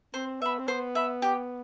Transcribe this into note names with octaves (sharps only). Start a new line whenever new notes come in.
C4 C5
B3 E5 B5
C4
B3 C5
E5 B5
G4